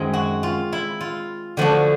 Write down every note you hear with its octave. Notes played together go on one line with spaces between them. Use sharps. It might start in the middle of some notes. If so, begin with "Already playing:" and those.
Already playing: F#2 D#3 G#3 C4
F#4
F4
E4
F4
D3 F3 A3 D4 F#4